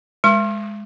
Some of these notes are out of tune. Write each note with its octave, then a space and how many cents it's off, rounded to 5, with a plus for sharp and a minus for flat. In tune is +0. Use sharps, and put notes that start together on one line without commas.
G#3 +0 C6 +45